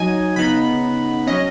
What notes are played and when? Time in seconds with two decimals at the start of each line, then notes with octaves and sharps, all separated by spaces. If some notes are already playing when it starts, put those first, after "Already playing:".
Already playing: F#3 D#4 D#5 G#5
0.36 C#3 B3 D#4 B5
1.27 F#3 C#4 D#5